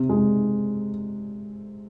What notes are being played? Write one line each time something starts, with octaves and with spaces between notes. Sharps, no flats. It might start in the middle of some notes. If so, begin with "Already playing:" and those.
Already playing: C3
G#3